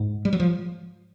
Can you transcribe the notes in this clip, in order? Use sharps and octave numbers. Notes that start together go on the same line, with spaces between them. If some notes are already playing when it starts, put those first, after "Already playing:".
Already playing: G#2
G3
F#3
F3